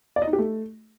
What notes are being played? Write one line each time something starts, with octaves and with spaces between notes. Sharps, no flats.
D5
D#5
D#4
G4
A3